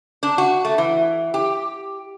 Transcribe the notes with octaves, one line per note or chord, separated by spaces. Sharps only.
D4
F#4
A3
E3
G4